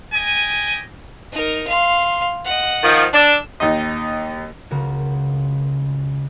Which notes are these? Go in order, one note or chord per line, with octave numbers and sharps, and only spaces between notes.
G4 D#5 G#5
D#4 A#4
F5 C6
D#5 F#5
D#3 F3
D4 E6
D#2 D#4 D#5
C#2 C#3 F#4 A#4